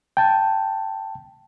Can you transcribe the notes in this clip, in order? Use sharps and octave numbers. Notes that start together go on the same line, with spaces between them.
G5 A5